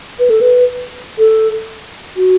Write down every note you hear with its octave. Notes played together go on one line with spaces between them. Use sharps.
B4
A4
B4
A4
F#4